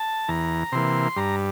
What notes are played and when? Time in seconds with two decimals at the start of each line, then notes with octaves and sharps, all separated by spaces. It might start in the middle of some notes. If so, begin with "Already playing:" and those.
Already playing: A5
0.28 E2 A#5
0.72 C3 E3 A#3 C6
1.16 G2 A#5